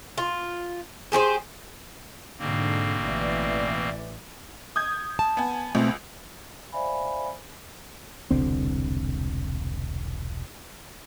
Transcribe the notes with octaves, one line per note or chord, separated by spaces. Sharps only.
F4
G4 G#4 B4 C5
G#2 B2 D3 A#3 C4
A1 E3 D5
D#6 G6 G#6
A5
B3 G#5
C#2 B2 A3 C4
C5 D5 E5 F5 G#5 B5
E1 C2 D3 C4